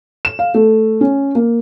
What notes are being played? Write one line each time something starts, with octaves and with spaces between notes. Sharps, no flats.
E7
F5
A3
C#4
A#3